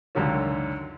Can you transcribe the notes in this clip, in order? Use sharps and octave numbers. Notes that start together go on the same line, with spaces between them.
C#2 F#2 D3 D#3 C#4